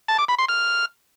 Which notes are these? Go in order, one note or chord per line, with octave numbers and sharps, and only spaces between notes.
A5
D6
B5
C6
F6